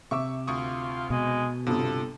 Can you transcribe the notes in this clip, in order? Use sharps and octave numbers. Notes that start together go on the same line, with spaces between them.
C3 E5 C#6 D6 E6
D2 F4 C#6 D#6
B2 G#3
G1 C3 F4 A4 D#6